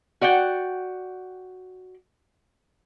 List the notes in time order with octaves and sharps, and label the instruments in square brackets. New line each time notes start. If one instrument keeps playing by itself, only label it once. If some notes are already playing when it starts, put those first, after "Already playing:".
[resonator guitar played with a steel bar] F#4 D5 F#5 G5